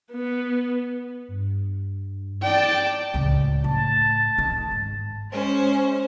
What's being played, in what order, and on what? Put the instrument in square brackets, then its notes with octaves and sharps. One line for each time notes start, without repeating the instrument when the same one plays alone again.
[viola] B3
[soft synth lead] G2
[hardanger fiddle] D5 A5 [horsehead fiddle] G5
[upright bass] D1 C#2
[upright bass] A2 [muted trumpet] A5
[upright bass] D#3
G#2
[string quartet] G#3 C#4 C5